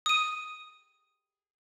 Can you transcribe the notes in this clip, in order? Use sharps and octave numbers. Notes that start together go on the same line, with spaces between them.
D#6 D#7